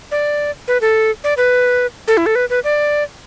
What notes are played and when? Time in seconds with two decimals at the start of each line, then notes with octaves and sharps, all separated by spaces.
0.11 D5
0.68 B4
0.81 A4
1.24 D5
1.37 B4
2.08 A4
2.17 E4
2.26 A4
2.35 B4
2.50 B4
2.64 D5